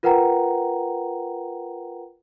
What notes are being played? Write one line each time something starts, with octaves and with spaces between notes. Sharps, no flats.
F4 A#4 B4 F#5 G5 A#5